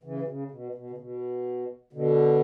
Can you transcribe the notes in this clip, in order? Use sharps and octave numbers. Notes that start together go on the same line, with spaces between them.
C#3 E3
B2
C#3
B2
B2
C#3
B2
B2 D3